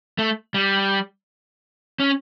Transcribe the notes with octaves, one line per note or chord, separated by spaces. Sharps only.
A3
G3
C#4